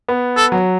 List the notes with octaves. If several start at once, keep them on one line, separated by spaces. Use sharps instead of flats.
B3
A4
F#3